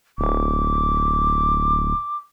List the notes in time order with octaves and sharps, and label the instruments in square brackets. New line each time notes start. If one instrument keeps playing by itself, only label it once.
[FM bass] D1 [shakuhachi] D6